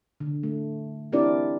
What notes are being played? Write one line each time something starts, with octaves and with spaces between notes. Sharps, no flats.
D3
A3
C4 D4 E4 G4 A#4 D5